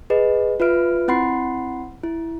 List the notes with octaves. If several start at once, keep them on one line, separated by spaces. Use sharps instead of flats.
G#4 B4 D#5
F4 B4 E5 F6 D7
C4 E4 F#5 B5 C6 C7
E4